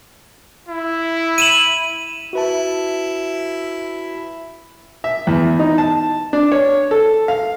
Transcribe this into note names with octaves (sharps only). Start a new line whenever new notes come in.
E4
D#7 E7 F#7
E4 F#4 B4 A5
E5
E2
D#4
A5
D4
C#5
A4
F5